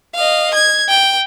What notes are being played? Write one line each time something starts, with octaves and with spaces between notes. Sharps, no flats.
D#5 F5
G#6
G5